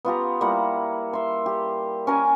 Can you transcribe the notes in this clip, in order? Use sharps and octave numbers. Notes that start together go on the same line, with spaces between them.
B3 F4 G4 A#5
G3 A#3 E4 F#5
E5 C6
G4
C#4 A#4 G#5